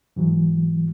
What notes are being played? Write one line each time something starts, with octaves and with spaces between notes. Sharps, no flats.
G#2 E3 F#3